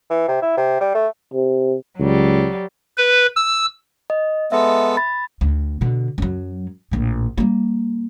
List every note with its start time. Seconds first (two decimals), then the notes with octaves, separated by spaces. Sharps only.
0.10 E3
0.28 C3
0.42 E4
0.57 C3
0.80 G3
0.94 A3
1.34 C3
1.99 C#2 F#3 G3
2.97 B4
3.36 E6
4.10 D#5
4.52 G#3 B3 A4 E5
4.97 B5 A6
5.41 D2
5.81 B2 D3
6.18 F#2 F#3
6.91 A#1 A2
7.38 G3 A#3